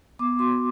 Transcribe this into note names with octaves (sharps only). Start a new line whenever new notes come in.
B3 D6
F#4 C6